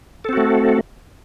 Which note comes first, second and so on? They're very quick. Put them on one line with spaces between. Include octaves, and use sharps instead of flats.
A4 C4 F#4 A3